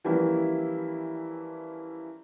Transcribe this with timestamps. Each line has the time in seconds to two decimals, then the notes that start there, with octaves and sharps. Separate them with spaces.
0.04 E3 F3 G3 A#3 C#4 E4